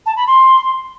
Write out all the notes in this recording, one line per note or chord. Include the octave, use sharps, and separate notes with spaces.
A5
B5
C6